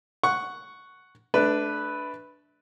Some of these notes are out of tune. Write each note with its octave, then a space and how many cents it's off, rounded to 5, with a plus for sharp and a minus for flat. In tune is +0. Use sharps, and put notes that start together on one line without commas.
F#5 +0 C#6 +0
A3 -30 D4 +0 B4 +0